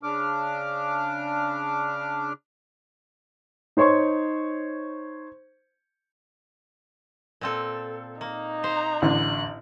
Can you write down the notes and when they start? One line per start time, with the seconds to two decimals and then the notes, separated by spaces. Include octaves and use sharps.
0.03 C#3 D4 D6 F6
3.77 D#4 C5 C#5 C6 C#6
7.41 A#2 C4 A4
8.21 A#3 D#4
8.64 C5 A#5
9.02 A1 D3 F#6